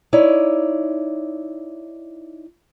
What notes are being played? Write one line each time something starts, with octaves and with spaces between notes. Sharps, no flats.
D#4 E4 C#5 D5